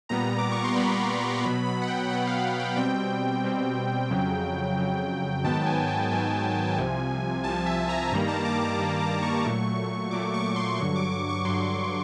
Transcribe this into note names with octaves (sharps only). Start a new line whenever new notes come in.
A#2 G3 B3 A#5
D6
C#6
C6
A#2 G3 B3 B5
B2 F#3 B3 B5
B5
F#5
G5
B2 F#3 B3 F#5
F5
F#5
G5
B2 G3 C4 G5
B2 G3 C4
F2 C#3 F#3
F2 C#3 F#3
G#2 D#3 F#3 B3 A5
G#5
G5
G#2 D#3 F#3 B3 G#5
C2 C3 F3
C2 C3 F3 A5
E5
A#5
G2 D#3 G3 A#3 A#5
A5
D6
D6
G2 D#3 G3 A#3
D6
C#6
A#2 F#3 A3
A#2 F#3 A3 D6
C#6
C6
G2 D3 F#3 C#6
D6
D6
C#6
G2 D3 F#3 C6